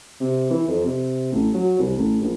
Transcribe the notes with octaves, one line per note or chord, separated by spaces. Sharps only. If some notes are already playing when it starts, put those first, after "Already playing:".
C3
E3
F2
C3
A1
F#3
C2
A1
A#1